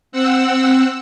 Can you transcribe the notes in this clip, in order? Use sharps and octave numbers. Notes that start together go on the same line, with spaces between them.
C4 F#5 E6